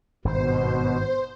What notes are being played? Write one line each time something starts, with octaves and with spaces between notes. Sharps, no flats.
G#1 G2 B2 C5